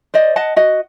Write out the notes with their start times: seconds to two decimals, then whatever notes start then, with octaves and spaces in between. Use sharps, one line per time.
0.14 C5 D5 D#5
0.36 D#5 F#5 A5
0.56 F#4 D#5